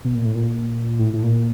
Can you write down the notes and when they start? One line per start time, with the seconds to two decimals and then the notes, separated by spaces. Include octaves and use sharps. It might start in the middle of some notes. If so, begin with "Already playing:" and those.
0.05 B2
0.15 A#2
0.25 A2
0.35 A#2
0.99 A2
1.14 A2
1.23 A#2